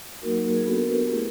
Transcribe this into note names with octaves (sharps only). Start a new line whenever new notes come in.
F#3 A#3 D#4 F#4 A#4
G#4
B3 D4 F#4 A4
A#4
B4
G4
A3 C4 E4 G#4